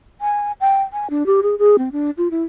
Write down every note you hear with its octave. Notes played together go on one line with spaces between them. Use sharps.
G#5
G5
G#5
D4
G4
G#4
G#4
C4
D4
F4
E4